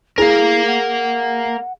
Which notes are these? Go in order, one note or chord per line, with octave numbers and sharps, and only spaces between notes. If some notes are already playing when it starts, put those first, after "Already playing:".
E4 G#4 A#4 F5
F#5